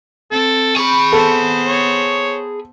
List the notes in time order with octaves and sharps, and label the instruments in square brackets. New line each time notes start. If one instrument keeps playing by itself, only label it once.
[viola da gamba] C4 [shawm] A4
[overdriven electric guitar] G#4 B5 [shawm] C#6
[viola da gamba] B3 C5 [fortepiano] A4
[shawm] C#5